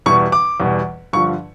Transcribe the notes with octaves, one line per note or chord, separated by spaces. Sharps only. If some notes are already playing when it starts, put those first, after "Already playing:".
E2 B2 G3 C#6
D6
E2 B2 G3
G2 D3 F3 C#6